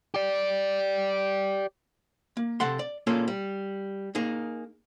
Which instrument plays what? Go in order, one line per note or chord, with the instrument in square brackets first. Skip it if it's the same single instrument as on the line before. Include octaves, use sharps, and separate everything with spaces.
[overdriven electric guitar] G4 D5
[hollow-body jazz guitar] A#3
C3 A4 F#5 C6
D5
A#2 A#3 C#4 F4 G#4 A4
G3
A#3 D#4 G#4